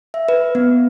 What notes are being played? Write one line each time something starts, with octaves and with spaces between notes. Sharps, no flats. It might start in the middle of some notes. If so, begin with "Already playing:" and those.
E5
B4
B3